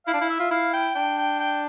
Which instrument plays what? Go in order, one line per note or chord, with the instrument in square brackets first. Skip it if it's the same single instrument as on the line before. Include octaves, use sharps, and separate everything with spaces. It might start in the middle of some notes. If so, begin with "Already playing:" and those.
[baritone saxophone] E4 [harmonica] F5
[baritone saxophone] D4
E4
[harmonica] E5
[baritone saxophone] F4
[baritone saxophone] E4 [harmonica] F5
[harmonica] G5
[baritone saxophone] D4 [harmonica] G5
[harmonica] G5
G5